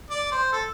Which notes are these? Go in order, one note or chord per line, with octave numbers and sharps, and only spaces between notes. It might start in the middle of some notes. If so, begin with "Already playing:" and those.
D5
C5
A4